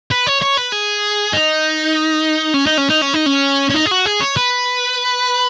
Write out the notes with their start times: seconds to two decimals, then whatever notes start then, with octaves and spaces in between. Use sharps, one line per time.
0.11 B4
0.26 C#5
0.42 C#5
0.57 B4
0.72 G#4
1.33 D#4
2.54 C#4
2.66 D#4
2.77 C#4
2.89 D#4
3.01 C#4
3.14 D#4
3.26 C#4
3.70 C#4
3.76 D#4
3.86 G#4
3.91 F#4
4.06 G#4
4.21 C#5
4.37 B4